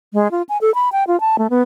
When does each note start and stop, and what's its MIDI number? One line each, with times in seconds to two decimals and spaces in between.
0.14 0.31 56
0.31 0.42 65
0.49 0.58 80
0.61 0.73 69
0.75 0.89 83
0.92 1.04 79
1.07 1.19 65
1.20 1.36 81
1.38 1.47 57
1.50 1.62 59